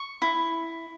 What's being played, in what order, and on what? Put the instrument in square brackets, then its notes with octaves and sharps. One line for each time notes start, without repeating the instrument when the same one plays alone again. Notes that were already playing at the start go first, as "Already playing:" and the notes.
Already playing: [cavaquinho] C#6
E4